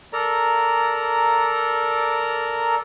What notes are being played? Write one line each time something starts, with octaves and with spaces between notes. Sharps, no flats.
A4 A#4 D5 A#5